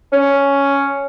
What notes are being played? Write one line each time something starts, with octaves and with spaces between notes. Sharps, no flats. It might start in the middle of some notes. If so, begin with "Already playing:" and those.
C#4